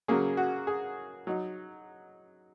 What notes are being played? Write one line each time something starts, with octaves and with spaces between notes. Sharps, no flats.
C#3 F#3 A#3 C#4 G#4
F#4
G#4
F#3 D#4